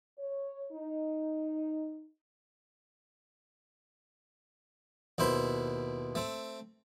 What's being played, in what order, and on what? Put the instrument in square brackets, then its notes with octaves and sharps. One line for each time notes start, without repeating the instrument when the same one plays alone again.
[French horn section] C#5
D#4
[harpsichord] D#2 B2 E4 C5 B5
A3 C4